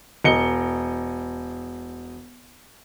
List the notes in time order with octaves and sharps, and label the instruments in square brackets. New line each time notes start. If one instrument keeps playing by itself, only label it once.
[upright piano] E1 D#5 C#7 G7